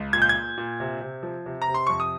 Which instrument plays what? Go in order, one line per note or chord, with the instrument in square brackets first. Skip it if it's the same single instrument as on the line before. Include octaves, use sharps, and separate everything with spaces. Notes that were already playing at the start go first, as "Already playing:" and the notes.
Already playing: [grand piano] C#2
A#2 G#6
G6
G#6
A#2
A#2
C3
C3
F3
C3
A#5
C3
C6
F2 C#6
D#6